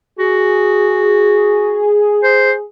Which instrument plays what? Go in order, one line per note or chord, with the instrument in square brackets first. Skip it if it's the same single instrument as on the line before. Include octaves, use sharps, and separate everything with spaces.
[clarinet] F#4 [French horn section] G#4
[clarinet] C5